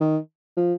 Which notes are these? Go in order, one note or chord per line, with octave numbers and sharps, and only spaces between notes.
D#3
F3